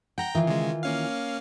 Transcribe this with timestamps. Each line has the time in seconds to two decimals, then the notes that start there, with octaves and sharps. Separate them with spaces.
0.18 F#5 G5 A#5 G6
0.34 D#3 E3 F4
0.47 C#3 G#3
0.83 A#3 C#4 F5